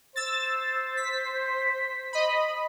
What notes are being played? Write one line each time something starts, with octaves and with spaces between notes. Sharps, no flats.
C5 E6 A6
B6
D#5 B5